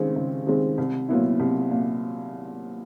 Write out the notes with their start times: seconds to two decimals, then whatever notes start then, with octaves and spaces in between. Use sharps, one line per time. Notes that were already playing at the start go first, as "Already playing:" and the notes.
Already playing: C#2 C3 D#3 G#3 C4
0.16 C#2
0.47 C3 D#3 G#3 C4
0.78 C2
1.09 A#2 F#3 B3 E4
1.40 C2
1.71 A#2